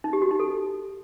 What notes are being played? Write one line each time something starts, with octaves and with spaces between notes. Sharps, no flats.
D#4
G4
F#4
D#4
A4